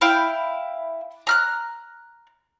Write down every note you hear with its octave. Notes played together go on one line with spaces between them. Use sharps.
E4 F5 G5
A#5 F6 F#6